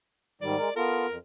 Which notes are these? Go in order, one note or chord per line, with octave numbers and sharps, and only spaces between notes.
G#2 D#3 G3 D5
G#3 A#4
B3 F4 A4 A#4
F2